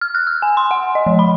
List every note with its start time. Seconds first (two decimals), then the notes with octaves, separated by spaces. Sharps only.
0.01 F6
0.15 F#6
0.27 E6
0.42 G#5
0.57 C6
0.71 F#5
0.95 D#5
1.06 F3
1.19 B5